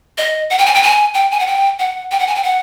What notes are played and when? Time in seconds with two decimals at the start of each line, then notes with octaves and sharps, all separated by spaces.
0.18 D#5
0.51 F#5
0.58 G5
0.66 G#5
0.74 G5
0.83 G#5
1.14 G5
1.31 G#5
1.39 F#5
1.47 G5
1.79 F#5
2.11 G5
2.20 F#5
2.27 G#5
2.36 G5
2.43 F#5